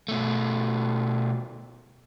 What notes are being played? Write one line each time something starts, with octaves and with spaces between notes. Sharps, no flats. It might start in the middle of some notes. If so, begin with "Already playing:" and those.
B2 A3